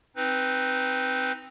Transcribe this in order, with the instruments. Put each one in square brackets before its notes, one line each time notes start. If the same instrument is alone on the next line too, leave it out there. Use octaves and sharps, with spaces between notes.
[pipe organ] C4 D#4 B4